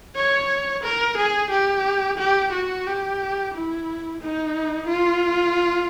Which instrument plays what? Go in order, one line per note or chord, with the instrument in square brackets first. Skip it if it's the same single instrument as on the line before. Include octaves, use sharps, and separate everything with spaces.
[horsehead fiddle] C#5
A#4
G#4
G4
G4
F#4
G4
E4
D#4
F4